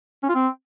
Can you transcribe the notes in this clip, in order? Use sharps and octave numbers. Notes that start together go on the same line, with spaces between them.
C#4
F4
C4